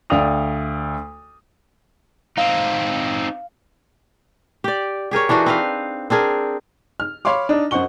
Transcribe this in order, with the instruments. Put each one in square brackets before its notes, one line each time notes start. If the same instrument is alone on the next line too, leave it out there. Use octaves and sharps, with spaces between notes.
[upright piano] D2 D5 F5 G5 D#6 F7
[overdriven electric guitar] C4 D#4 [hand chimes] F5
[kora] G4 D5
G4 G#4 A#4 C#5
E3 D4 D#4 F#4
C4 B4 F5
C4 D4 G#4 A#4
[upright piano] F6
C#5 F5 B5 C6 D6
D4 D#4
F#2 C5 D#5 F#5 C#6 G7